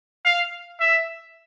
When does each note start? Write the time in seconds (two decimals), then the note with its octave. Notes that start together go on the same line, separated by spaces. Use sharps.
0.25 F5
0.80 E5